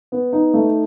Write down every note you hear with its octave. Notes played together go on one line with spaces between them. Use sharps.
B3
D#4
A3